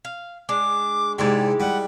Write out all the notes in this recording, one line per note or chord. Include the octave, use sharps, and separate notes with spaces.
F5
G#3 D4 D6
G#2 C3 G#3 E4 G4 D5
G3 F#5